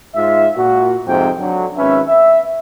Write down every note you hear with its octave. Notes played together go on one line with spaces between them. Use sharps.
G#2 F4 E5
A#2 F#4
F2 G#2 C3 F3 G5
D3 F#3
G#1 C#4 B4 E5
E5